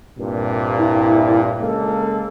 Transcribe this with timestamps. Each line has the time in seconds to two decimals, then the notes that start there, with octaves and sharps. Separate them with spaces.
0.19 C2 G2 A#2
0.77 E4
1.61 C#3 G#3 A#3 A4